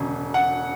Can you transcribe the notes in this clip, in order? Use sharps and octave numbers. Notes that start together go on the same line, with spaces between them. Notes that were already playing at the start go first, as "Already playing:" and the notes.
Already playing: E1 D2 C#3
F#5